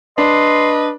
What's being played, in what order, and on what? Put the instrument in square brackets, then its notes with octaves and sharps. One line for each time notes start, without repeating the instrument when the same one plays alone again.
[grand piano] D4 [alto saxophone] B4 [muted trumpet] D#5 [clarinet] C6